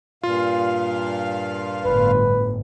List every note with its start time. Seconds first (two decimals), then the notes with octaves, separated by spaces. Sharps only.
0.23 G2 A#2 F4 F5
1.84 G1 A2 B4